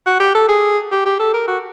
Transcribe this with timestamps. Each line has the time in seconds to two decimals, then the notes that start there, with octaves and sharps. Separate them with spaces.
0.06 F#4
0.20 G4
0.35 A4
0.48 G#4
0.91 G4
1.06 G4
1.19 A4
1.34 A#4
1.48 F#4